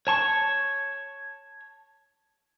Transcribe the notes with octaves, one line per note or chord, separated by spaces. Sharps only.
C#5 A5 C#6